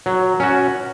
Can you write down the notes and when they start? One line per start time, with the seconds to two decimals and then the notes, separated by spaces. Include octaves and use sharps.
0.06 F#3
0.40 C#4 F#4